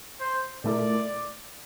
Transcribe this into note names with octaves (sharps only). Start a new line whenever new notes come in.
C5
A#2 A3 E4 A#4 D5